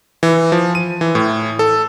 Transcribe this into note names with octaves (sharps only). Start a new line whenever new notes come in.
E3
F3
D#7
E3
A2
A4